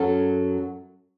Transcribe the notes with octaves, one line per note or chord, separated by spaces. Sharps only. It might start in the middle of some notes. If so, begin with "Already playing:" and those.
Already playing: F#2 F#3 C#4 A4